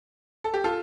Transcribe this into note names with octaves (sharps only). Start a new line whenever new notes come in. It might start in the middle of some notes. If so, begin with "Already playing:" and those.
A4
G4
F4 A4